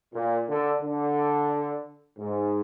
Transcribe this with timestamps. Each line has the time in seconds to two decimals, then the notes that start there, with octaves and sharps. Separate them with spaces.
0.14 A#2
0.48 D3
0.82 D3
2.19 G#2